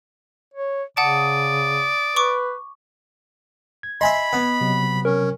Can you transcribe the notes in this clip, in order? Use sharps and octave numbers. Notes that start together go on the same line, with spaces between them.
C#5
C#3 D5 F#5 A5 D#6
B4 C#6 D6
G#6
D#5 E5 G#5 B5 C6
B3
C3 F#3
C#4 A#4